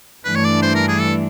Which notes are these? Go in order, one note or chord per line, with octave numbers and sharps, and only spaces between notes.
G2 E3 A3 D4 B4
C#5
D5
C5
A#4
G#4
A4